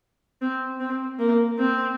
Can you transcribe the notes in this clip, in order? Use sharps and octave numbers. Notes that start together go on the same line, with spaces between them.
C4
C4
A#3
C4